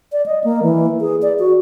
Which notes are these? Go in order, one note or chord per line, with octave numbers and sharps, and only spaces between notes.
D5
D#5
A#3
E3
G#4
D5
F#4